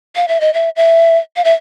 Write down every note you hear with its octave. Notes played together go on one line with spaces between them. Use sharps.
F5
E5
D#5
E5
E5
F5
E5